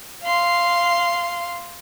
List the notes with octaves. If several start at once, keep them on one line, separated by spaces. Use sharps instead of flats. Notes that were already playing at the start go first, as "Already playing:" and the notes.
F5 C6